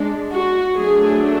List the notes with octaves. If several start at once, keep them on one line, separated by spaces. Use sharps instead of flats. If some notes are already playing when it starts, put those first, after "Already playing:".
Already playing: G#3 D4
F#4
F#3 A3 D4 G#4